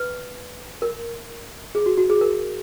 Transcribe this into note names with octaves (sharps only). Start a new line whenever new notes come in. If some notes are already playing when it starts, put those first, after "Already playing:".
Already playing: B4
A#4
G#4
F#4
F#4
G#4
A#4